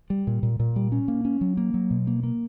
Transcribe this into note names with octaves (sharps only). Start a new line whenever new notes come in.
G3
A#2
A#2
A#2
G3
C#4
A#3
C#4
F#3
A#3
F#3
B2
A#3
A#3